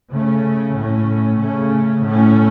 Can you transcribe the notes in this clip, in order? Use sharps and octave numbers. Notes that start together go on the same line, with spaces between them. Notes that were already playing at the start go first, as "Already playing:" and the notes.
C#3 A3 C#4
A2 A3 C#4
C#3 A3 C#4
A2 A3 C#4